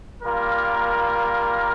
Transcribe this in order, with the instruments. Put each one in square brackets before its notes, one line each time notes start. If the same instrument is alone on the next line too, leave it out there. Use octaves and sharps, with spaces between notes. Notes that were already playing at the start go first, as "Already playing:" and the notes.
[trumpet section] G3 A#3 F4 A#4